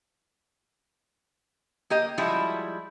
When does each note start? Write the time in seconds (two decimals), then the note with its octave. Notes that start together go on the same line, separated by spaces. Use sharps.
1.90 A#3 G4 D#5
2.18 F3 G3 G#3 E4 F#4